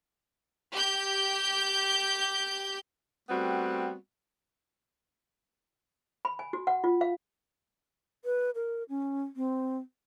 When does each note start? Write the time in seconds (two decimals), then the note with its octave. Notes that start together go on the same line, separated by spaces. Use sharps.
0.72 G4 G6
3.29 G3 A3 B3 C4 F#4
6.25 B5
6.39 G#5
6.53 F#4
6.67 F#5
6.84 F4
7.01 F5
8.25 B4
8.55 A#4
8.89 C#4
9.36 C4